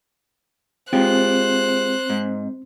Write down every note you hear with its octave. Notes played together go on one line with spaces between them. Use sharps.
G#3 C4 F4 G4 C5 F#6
G#2